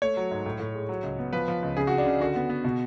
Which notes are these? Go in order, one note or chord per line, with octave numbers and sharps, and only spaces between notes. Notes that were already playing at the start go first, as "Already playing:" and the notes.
A3 C#5
F#3
G#2
A2
A2
G#3
F#3
C#2
B3
F3 B4
F3
C#2
C#3 G#4
C#3 F#4
D4
C#3
D3 F#4
B3
B3
B2